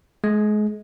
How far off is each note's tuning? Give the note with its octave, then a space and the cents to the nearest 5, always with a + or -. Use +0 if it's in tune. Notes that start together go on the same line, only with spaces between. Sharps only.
G#3 +30